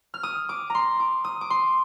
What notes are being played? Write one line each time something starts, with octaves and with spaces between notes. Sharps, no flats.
F6
D#6
D6
A#5 C6
D6
D#6
D6
C6